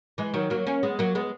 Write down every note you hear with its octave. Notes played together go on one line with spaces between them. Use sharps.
E3 G#3
D#3 F#3
F#3 A#3
A#3 C#4
G#3 B3
F#3 A#3
G#3 B3